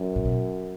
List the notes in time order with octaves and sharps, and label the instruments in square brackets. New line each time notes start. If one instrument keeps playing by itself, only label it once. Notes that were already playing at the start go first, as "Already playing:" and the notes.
Already playing: [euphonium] F#2
[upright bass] A2
B2